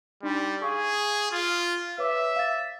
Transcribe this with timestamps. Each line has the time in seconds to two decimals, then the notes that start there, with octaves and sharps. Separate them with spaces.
0.23 G3 D4 D#4 C6
0.62 G#4 F5 C#6
1.32 F4 F6
1.98 B4 C#5 E5 D6
2.36 F5 A6